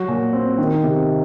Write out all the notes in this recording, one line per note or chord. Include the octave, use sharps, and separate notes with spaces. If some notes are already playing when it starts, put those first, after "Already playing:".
Already playing: F#3 F#4
A#2
C4
D#3
C3